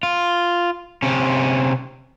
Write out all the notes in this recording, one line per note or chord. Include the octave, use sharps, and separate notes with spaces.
F4
C3 C#4